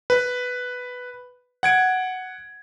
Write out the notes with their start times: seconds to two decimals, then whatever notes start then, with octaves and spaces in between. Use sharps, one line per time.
0.10 B4
1.63 F#5 G#6 D7